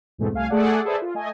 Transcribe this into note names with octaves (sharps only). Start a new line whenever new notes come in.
E2 G#2 B2 G#3 A3 C4
C2 A3 F5 G#5
A3 G#4 A4 D5 F#5
G#4 A4 B4 C5 D5 E5
F4
A3 D#5 G#5